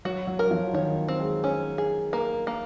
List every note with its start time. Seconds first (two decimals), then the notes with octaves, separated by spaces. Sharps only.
0.05 F#3 F#4
0.27 F#3
0.39 A#4
0.47 F#3
0.51 F3
0.73 D#3 C#5
1.08 C4
1.20 G#3
1.44 C#4
1.78 G#4
2.13 A#3
2.47 A#3